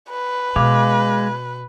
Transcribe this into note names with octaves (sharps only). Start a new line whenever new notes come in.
B4
B2 G#3 F5 D6